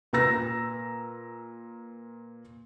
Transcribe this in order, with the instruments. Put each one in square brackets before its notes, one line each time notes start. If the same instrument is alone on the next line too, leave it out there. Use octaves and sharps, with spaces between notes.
[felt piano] A#2 B4 A#5 E6 A#6